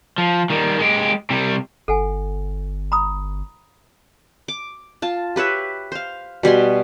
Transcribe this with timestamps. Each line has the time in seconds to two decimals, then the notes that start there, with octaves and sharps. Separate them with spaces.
0.18 F3
0.50 D#3 G3
0.79 G#3 G4
1.30 C3 G3
1.88 G1 A4 F#5 G#5
2.92 A#5 B5 D#6
4.48 D6
5.02 F4 A5
5.36 G4 B4 C#5 E5
5.92 C5 F5
6.43 B2 G3 G#5 C6